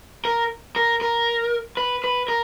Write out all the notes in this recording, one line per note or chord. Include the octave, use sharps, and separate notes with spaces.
A#4
A#4
A#4
B4
B4
A#4